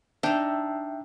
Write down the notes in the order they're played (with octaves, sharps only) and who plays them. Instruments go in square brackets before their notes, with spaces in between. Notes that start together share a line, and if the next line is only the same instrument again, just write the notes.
[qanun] D4 D#4 [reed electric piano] E5 G5 E6